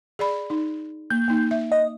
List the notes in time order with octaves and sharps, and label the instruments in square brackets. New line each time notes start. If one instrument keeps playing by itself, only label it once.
[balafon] G#4 D5 B5
D#4
[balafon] A#3 [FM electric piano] G6
[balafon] A#3 D#4
E5
[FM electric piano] D#5